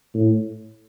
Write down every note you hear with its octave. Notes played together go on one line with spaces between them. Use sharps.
A2